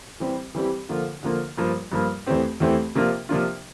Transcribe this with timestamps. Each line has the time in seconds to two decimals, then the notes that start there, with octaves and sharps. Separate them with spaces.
0.20 E3 G3 C4 G4
0.55 E3 G3 C4 G4
0.89 D3 F3 A#3 F4
1.23 D3 F3 A#3 F4
1.58 G2 F3 A#3 F4
1.92 G2 F3 A#3 F4
2.26 E2 E3 A3 C4 G4
2.60 E2 E3 A3 C4 G4
2.95 C3 F3 A#3 D4 F4
3.29 C3 F3 A#3 D4 F4